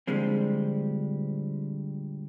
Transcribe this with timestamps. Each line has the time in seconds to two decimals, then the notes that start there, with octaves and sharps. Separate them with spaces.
0.07 A#2 D3 F3 G3 G#3 C4